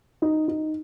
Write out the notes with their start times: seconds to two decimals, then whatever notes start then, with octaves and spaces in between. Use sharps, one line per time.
0.22 D#4
0.48 D#4